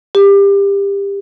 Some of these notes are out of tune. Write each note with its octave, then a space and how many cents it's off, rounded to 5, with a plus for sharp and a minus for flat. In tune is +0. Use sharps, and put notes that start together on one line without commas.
G4 +25